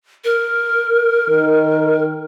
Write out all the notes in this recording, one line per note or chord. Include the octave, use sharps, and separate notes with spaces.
A#4
D#3